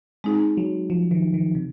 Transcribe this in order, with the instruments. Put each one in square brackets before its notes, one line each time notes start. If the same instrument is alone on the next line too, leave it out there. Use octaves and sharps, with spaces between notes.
[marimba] G#3 C4 D#4 G#4
[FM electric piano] F#3
F3
D#3
D#3
C3